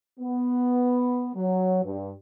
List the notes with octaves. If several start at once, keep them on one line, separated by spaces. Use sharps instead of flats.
B3
F#3
G2